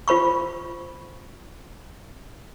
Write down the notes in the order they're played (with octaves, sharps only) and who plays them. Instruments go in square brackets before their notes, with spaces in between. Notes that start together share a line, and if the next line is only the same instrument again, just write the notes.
[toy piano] F4 C5 B5 C#6